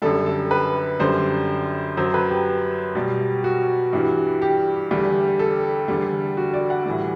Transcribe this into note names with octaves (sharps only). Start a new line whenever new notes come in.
F#2 D3 G3 A4
A4
B4
F#2 D3 G3 C5
F#2 F#3 C5
B4
G4
B2 G3
F#4
G2 E3 G3
G4
E2 D3 G3
A4
E2 D3 G3
F#4
D5
F#5
A2 E3 G3